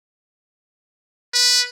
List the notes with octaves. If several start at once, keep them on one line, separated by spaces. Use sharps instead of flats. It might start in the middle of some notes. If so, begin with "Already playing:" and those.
B4